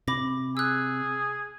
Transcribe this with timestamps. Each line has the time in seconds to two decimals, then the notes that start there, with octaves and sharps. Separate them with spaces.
0.08 C3 B5 D6 A#6
0.57 G#4 E6 F#6